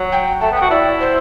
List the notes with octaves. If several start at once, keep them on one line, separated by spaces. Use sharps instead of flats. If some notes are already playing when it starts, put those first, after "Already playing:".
Already playing: F#3
G5
A3 A5
B3
G5
F#4
E4 D5
C5